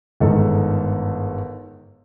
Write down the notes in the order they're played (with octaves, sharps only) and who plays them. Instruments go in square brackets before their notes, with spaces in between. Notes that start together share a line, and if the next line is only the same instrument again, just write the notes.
[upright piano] G1 G#2 D#3 A4 A#4